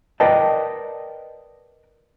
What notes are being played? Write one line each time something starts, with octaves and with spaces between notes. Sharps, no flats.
A#4 B4 D5 D#5 G5 A5